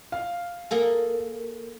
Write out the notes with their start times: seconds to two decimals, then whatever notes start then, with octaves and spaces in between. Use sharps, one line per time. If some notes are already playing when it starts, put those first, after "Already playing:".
0.12 F5
0.71 A#3 G#4 A4